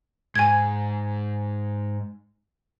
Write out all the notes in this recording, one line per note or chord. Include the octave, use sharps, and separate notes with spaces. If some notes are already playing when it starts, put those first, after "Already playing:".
G#2 G#5 G#6